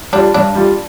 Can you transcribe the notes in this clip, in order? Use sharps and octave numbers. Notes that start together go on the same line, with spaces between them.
G3 D4 F4
G2 D4
G3 F4